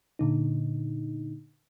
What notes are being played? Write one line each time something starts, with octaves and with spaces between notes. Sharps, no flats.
A#2 D3 D#4